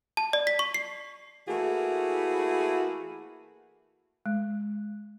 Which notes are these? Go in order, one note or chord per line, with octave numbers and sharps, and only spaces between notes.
A5
D5
B6
C#6
C7
E3 A3 A#3 E4 F#4 G#4
G#3